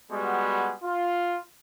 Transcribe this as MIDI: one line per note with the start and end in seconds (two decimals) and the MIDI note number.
0.11 0.73 55
0.11 0.73 56
0.11 0.73 59
0.11 0.73 66
0.84 1.39 65